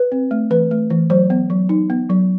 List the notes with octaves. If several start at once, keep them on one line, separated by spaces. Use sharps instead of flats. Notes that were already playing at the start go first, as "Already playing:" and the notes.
Already playing: B4
C4
A3
E3 B4
A3
E3
F#3 C5
B3
F#3
D#4
B3
F#3